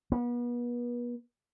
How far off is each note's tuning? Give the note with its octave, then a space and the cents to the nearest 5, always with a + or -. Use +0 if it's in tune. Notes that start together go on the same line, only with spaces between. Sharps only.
B3 -35